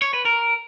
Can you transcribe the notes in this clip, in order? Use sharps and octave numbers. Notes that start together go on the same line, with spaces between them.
C#5
B4
A#4